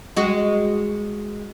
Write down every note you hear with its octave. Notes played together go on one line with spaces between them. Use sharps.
G#3 F#4